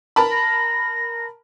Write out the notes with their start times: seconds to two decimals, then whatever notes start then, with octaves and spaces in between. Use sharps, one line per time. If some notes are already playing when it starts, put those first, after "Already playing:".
0.16 A#4 A5 B5
0.31 A#6